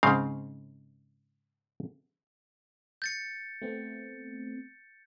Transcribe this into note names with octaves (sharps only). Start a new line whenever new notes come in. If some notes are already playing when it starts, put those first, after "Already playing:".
G#2 C#3 C4 F5
G6 A6 C#7
A3 B3 C4